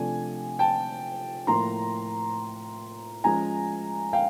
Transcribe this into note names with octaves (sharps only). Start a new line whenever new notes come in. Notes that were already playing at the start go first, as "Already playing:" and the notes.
Already playing: C3 F3 A3 D4 G#5
G5 A5
A2 F3 A#3 A#5 C6
F3 G#3 C#4 G#5 A#5
F5 G5